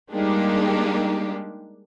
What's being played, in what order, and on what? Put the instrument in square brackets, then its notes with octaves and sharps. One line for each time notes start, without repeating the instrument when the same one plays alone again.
[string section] G3 G#3 A#3 D4 D#4 G4